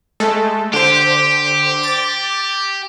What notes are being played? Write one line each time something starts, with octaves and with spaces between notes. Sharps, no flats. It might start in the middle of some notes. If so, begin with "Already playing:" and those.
G#3 A3 A4
D3 G4 C5
D6 A6